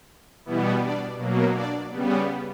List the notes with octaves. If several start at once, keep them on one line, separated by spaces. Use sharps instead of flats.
B2 E3 G3 B3 E4
D4 D5
B2 F#3 A#3
D4 D5
C#3 G3 B3